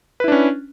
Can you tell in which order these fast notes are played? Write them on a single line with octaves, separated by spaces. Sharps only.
B4 E4 D4 C#4